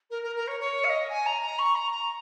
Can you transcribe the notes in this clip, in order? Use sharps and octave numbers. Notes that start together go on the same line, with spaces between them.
A#4
A#4
A#4
C#5
C#5
F5
D#5
G#5
A#5
A#5
C#6
A#5
A#5